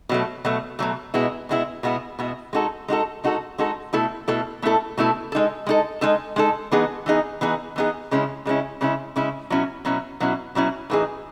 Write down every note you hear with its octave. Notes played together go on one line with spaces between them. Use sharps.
B2 F#3 A3
B2 F#3 A3
B2 F#3 A3
B2 G#3 B3 E4
B2 G#3 B3 E4
B2 G#3 B3 E4
B2 G#3 B3 E4
G#3 D#4 F#4 A4
G#3 D#4 F#4 A4
G#3 D#4 F#4 A4
G#3 D#4 F#4 A4
B2 A3 E4 A4
B2 A3 E4 A4
B2 A3 E4 A4
B2 A3 E4 A4
G#3 D#4 A4
G#3 D#4 A4
G#3 D#4 A4
G#3 D#4 A4
E3 B3 D#4 G#4
E3 B3 D#4 G#4
E3 B3 D#4 G#4
E3 B3 D#4 G#4
C#3 G#3 C#4 E4
C#3 G#3 C#4 E4
C#3 G#3 C#4 E4
C#3 G#3 C#4 E4
B2 F#3 C#4 E4
B2 F#3 C#4 E4
B2 F#3 C#4 E4
B2 F#3 C#4 E4
A2 E3 B3 D#4 G#4